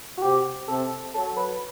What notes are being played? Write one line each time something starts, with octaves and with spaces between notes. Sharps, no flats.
F#4
C3 G4
C3 A4
F#3 A4
B4